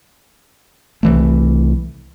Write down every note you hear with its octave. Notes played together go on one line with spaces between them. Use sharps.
C2 E3 A3